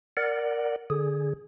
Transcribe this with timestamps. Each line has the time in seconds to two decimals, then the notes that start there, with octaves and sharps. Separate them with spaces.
0.17 A#4 D5 F#5
0.90 D3 G#4